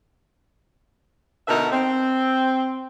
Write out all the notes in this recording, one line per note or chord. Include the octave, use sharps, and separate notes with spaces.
B2 D3 D#4 A#4 B4 E5
C4